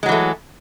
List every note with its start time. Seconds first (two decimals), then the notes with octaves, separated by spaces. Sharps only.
0.03 G#3
0.06 F#3
0.09 E3
0.12 A3